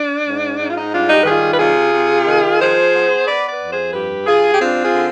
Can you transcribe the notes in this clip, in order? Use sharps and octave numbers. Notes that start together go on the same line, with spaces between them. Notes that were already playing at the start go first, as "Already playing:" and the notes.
Already playing: D4
G#2
G#2 D#4
F4
D#4
G3 D4 F4
D#4 G4
B4
D#3 F4 G#4
B4
C3 F4 G#4
C3
D#3
F3 G#4 C5
B3
B3 B4 D5
B4 D5
F2
G#4 C5
G2 G4 B4
G2 F4 G#4
G4
C4 D4 F4
F4 G#4
D3